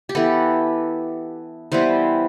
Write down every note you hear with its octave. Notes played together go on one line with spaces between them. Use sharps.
G4
E3 B3 A4
E3 G3 B3 C5